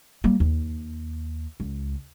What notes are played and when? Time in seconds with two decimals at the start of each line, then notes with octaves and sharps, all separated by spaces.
0.24 G3 A#3
0.40 D#2
1.60 C#2